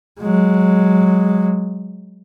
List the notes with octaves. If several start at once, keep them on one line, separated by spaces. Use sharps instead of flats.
F#3 G#3